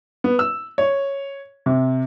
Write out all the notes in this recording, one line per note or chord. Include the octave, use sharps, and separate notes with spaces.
B3
E6
C#5
C3